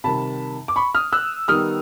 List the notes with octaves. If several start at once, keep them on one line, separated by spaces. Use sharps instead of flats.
C3 D#3 G3 A5 B5
D6
B5 C#6
D#6 F6
E6 F#6
D#3 G3 B3 D#4 D#6 F6